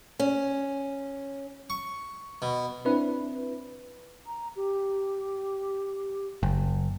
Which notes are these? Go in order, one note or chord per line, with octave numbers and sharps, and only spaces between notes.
C#4
C#6
B2
C4 D4 E4 B4
A#5
G4
F#1